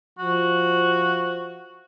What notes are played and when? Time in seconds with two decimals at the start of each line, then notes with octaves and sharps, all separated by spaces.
0.19 F3 F#4